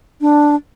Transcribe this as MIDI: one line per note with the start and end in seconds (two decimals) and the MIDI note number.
0.21 0.55 62